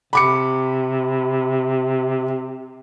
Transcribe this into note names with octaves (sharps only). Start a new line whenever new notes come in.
C3 B5 D6 C#7